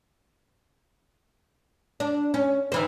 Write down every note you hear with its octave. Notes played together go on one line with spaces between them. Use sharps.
D4
C#4
D#3 E3 C5